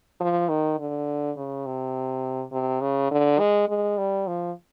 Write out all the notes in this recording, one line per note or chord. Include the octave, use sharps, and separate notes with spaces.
F3
D#3
D3
C#3
C3
C3
C#3
D3
G#3
G#3
G3
F3